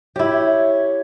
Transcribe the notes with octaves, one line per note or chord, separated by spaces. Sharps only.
E4 G4 C#5